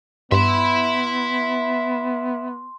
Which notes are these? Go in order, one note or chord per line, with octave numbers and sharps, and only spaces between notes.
G2 B3 E5 B5 C6